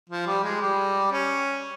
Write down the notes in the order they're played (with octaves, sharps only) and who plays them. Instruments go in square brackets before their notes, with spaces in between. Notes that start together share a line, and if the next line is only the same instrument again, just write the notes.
[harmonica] F3
G3
G#3
G3
C#4